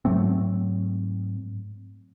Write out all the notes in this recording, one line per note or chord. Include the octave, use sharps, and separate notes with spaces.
G#2 F#3 A3 C4